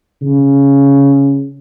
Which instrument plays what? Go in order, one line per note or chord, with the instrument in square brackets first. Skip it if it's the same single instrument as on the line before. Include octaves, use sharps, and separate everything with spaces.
[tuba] C#3